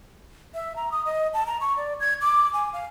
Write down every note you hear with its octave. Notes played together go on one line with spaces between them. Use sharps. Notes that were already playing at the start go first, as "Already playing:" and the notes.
E5
A#5
D#6
D#5
A5
A#5
C#6
D5
G#6
D6
G#5
F5